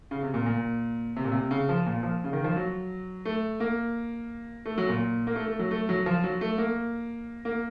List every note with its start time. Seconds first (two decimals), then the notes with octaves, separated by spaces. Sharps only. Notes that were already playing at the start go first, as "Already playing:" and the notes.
0.11 C#3
0.23 C3
0.34 A#2
0.46 A#2
1.16 C3
1.24 A#2
1.32 C3
1.51 C#3
1.69 F3
1.86 A#2
2.03 F3
2.24 C#3
2.33 D#3
2.44 F3
2.56 F#3
3.25 A3
3.60 A#3
4.66 A3
4.78 F#3
4.89 A#2
5.27 A#3
5.36 A3
5.48 A3
5.59 F#3
5.71 A3
5.89 F#3
6.06 F3
6.24 F#3
6.41 A3
6.58 A#3
7.45 A#3